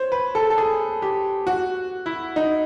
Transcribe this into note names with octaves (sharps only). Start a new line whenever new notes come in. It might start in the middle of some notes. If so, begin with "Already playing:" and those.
Already playing: C5 C#5
B4
A4
A4
G#4
G4
F#4
E4
D#4